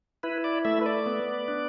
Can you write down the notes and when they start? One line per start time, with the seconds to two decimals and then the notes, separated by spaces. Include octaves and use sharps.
0.23 E4 B4
0.44 D5
0.65 A3 E5
0.81 B4
0.86 D5
1.06 B3
1.48 D4